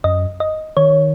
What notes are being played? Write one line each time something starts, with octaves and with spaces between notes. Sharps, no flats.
F#2 D#5
D#5
D#3 C#5